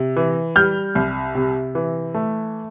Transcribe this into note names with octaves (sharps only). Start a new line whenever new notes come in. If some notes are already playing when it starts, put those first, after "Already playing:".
Already playing: C3
E3
G3 F6 G6
C2
C3
E3
A3